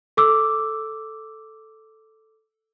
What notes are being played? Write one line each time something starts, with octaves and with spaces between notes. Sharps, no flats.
A4 D6 E6